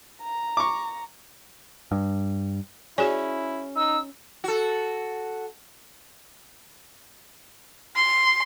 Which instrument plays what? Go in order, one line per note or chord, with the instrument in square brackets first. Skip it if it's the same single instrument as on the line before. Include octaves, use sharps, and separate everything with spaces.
[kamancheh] A#5
[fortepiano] C#6 D6
[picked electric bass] G2
[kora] C#4 [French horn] E4 [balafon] F#4 G#4 D5
[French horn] D#4 [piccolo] E6
[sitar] F#4 A4
[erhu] C6